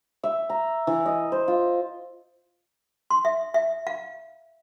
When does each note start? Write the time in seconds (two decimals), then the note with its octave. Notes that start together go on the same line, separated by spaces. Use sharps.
0.24 E5
0.50 A#5
0.87 E3
1.06 D#5
1.32 C5
1.48 F4
3.10 C6
3.25 E5
3.54 E5
3.87 F5